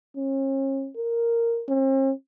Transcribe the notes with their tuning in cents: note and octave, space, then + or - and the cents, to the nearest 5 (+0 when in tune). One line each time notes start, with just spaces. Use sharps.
C#4 -40
A#4 -5
C4 +45